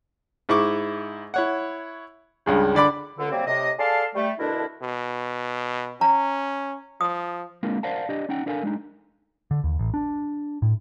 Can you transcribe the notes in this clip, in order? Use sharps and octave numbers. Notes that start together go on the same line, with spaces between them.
G#2 E4 C#6 D6
E4 C#5 F#5
C#2 G2 C#3
D3 D5 B5 D6
C#2 D3
C3 F#3 G3 A#3 C4
A2 C3 D#5
G#4 A4 D5 F5 A5 C6
G3 A3
B2 D3 A3 D4 E4 A#4
B2
C#4 A#5
F3 D#6
G#3 A#3 C4 D4 F4 A#4
A#4 C5 D5 F5 F#5 A5
D4 G4 D5 D#5
C#4 D#4 F#5 G5
D4 E4 A4 A#4 F5 G#5
G#3 D4 D#4
D3
D#2
A1
D4
A2